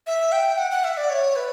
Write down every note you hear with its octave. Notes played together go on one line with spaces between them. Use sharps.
E5
G5
F#5
F#5
E5
D5
C#5
B4